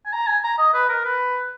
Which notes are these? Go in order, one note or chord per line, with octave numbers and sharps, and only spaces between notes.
G#5
A#5
G#5
A#5
D#5
B4
A#4
B4